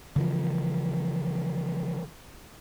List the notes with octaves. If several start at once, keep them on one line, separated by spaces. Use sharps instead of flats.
C#3 E3 F3